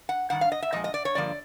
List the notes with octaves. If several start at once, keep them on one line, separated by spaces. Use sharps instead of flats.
F#5
G2 D#3 F#5
F5
D#5
E5
A#2 F3 G#3 D#5
D#5
D5
C#5
G2 D3 F3 A#3 D5